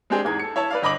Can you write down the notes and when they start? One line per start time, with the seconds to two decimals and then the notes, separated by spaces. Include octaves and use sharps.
0.10 G#3 C4 D4 G4 G#4
0.24 E2 G#2 G#4 G#6
0.40 A4 C#7
0.56 E4 C#5 E5 A5
0.71 B4 D5 F5
0.82 G1 D#5 B5 D6 F#7